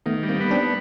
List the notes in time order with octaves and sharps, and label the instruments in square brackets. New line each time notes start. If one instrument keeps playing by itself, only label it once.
[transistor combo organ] D#3 [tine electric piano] A3 B3
[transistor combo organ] G3
[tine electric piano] A#3 C4
[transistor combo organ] B3
[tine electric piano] C4 D4